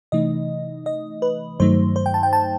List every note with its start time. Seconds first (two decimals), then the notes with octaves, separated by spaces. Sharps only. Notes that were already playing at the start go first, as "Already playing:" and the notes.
0.12 C3 E3 A3 D#4 D#5
0.86 D#5
1.22 B4
1.60 G2 D#3 F#3 A3 D#4 C5
1.96 C5
2.06 G5
2.14 A5
2.23 G5
2.33 A5